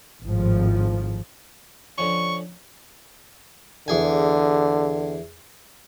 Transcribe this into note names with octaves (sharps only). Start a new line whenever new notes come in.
G#1 A2 F3
D3 F3 C#4 C#6
E2 D3 G#4 G#5